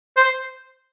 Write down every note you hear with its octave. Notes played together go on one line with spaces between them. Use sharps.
C5